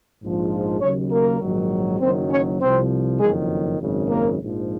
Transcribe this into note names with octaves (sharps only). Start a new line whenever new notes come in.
A#1 G#2 F3
D#2 C#3 F#3 C#4 C#5
A#3 A#4
A#1 G#2 D#3 F#3
F#1 F#2 D#3 F#3 C4 C5
C#4 C#5
C2 C3 F3 C4 C5
F#1 F2 D#3 F#3 G#3 G#4
G#1 F#2 C#3
A#3 A#4
A#1 G#2 F3